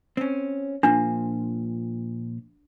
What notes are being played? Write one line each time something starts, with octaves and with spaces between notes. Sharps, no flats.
C4 C#4
A#2 F3 A#3 D4